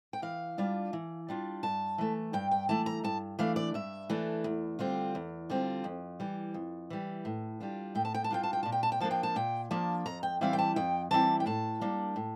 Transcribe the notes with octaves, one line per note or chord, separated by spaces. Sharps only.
G5
E3 F5
G3 D4 F4
E3
G3 D4 F4
G2 A5
E3 A3
G2 G5
G5
E3 A3 A5
A#5
G2 A5
E3 A3 D4 F5
D5
G2 E5
E3 A3 D4
E2
D3 G3 C4 F4
E2
D3 G3 C4 F4
F2
E3 G3
F2
E3 G3
A2
G3 D4 F4
A2 G5
A5
G5
A5
G3 D4 F4 G5
A5
G5
A#2 A5
G5
A5
G5
F3 A#3 D4 A5
G5
A5
A#2 G5
F3 A#3 D4 A5
F2 A#5
G5
E3 G3 C4 E4 F5
G5
A5
F2 G5
E3 G3 C4 E4 A5
G5
A2 A5
G3 A#3 D4
A2